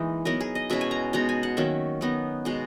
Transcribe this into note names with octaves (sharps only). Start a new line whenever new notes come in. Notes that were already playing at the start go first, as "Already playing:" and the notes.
Already playing: E3 G#3 A#3 D#4
F#3 B3 D#4 A#4
G#4
D#5
B2 G#3 C#4 E4 E5
G#5
A#5
B2 G#3 D#4 A#5
G#5
F#5
D#3 F#3 A#3 C#4 E5
F#3 B3 D#4
B2 G#3 B3